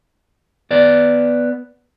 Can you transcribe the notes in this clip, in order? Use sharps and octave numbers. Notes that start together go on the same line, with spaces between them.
B3 D5